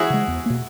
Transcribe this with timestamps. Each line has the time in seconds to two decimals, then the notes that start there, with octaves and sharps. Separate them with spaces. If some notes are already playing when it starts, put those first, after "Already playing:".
Already playing: E4 F#4 G#4
0.10 C#3 G#3
0.28 E2
0.46 B2 A#3